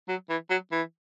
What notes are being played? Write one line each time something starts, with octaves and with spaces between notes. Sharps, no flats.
F#3
E3
F#3
E3